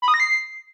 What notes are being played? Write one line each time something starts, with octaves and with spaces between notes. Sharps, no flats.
B5
D#6
A#6
C7